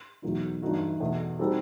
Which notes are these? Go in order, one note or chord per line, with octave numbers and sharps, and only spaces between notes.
E2 B2 F#3 A3 D#4
G2 E3 A3 D#4 F#4
E2 B2 A3
G3 C4 D#4 F#4 A4